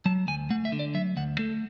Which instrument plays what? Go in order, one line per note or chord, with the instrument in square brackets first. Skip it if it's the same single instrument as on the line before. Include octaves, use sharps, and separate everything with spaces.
[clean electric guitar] F#3 A5
D2 G#5
A3 F#5
E5
D3
D5
F#3 E5
D2 F#5
A3 A4